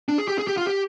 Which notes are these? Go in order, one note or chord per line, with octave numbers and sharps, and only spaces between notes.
D4
G#4
G4
G#4
G4
F4
G4